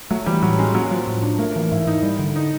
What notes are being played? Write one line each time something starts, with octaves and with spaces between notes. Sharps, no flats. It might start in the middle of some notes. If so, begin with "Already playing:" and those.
F#3 A3
E3 G3
A2 F#3
G#3 C#4
F#3 A#3
F3 F#3
A2
D4
A3 A#3
E3 A#3
G#2 E4
G#2 D#4
G3
D3
D#4